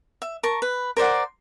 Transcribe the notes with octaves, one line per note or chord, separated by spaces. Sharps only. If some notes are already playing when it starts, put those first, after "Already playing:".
E5
A#4 A5 C#6
B4
A#4 C5 D5 F#5